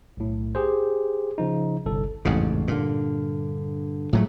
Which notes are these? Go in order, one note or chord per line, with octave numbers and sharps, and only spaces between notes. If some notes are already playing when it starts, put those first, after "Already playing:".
B1 A2
G4 G#4 C5
C#3 F3 D#4
G1 C2 A4
A1 F2 G#2 C#3
G2 A#2 D3
A2 F3 F#3 G#3 A3